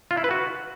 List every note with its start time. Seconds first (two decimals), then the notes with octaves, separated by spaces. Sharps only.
0.11 F4
0.17 E4
0.24 B4
0.31 F#4